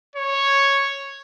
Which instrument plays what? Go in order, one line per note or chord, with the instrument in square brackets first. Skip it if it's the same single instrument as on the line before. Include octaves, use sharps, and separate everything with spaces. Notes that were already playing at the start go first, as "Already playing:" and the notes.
[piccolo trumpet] C#5